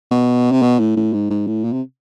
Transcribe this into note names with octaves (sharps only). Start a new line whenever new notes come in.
B2
C3
B2
A2
A2
G#2
G#2
A2
A#2
C3